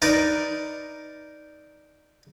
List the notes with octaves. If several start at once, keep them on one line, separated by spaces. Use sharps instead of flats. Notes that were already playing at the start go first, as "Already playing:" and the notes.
D#4 A#4 B4 D5